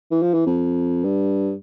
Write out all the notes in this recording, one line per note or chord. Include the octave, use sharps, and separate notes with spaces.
E3
F3
E3
F2
G2